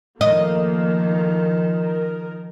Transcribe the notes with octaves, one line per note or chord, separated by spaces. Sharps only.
D#3 F3 A3 A#3 D#5
A#4